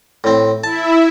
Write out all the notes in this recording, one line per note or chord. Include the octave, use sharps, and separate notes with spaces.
A2 C4
E4 E5 A5